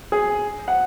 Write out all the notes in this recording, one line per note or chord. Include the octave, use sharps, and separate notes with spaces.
G#4
F#5